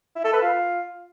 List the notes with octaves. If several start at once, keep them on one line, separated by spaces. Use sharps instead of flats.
E4
A4
B4
F4